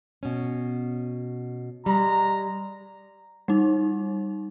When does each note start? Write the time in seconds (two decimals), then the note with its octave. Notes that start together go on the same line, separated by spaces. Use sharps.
0.23 B2 C#4
1.86 G3 G#3 A#5
3.48 G3 D#4